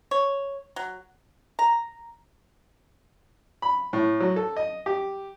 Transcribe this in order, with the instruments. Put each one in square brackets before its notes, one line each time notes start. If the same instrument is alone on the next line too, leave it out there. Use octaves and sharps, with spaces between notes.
[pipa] C#5
F#3
A#5
[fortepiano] B5
A2
F#3
A4
D#5
G4